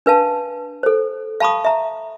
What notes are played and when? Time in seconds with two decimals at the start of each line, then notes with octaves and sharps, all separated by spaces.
0.06 D4 B4 F5 A5
0.83 A4 C5
1.40 F5 A5 B5 C#6 D#6
1.65 E5 A#5